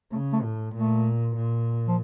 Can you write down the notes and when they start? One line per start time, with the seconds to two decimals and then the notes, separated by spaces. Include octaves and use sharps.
0.12 C#3 A3
0.33 A3
0.43 A2
0.74 A#2 A3
1.35 A#2
1.88 F3